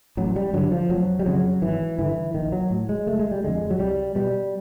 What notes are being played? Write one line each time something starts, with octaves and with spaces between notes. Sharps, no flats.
A1 F#3
G3
G2 D3 F#3
F3
F1 F#3
G3
F2 C#3 F#3
G#1 E3
G2 D3 E3
A#1 D#3
F#3
A2
G#3
F#1 A3
G#3
G3
F2 D3 G#3
F#3
C2 G3
B2 G3